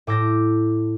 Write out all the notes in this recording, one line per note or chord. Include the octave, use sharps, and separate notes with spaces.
A2 D6 E6 G6 A#6